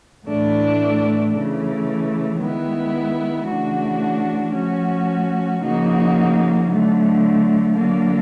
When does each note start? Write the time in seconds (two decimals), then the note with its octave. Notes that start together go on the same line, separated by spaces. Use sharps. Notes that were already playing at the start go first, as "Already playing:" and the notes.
0.25 A2 E3 A3 D4
1.32 C#3 E3 A3
2.39 D#3 G#3 B3 E4
3.45 C#3 E3 A3 D4 F#4
4.53 F3 A3 C#4 F#4
5.60 C#3 F3 A#3 D#4 F#4
6.67 D3 F#3 A3
7.74 D3 F#3 A#3